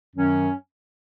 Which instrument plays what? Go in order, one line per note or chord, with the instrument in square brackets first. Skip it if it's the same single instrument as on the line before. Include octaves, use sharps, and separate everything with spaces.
[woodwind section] F#2 D#3 F#3 C#4